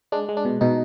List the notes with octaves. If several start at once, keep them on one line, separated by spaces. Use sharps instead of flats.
G#3 D4
G#3
D4
B2
B2 D#4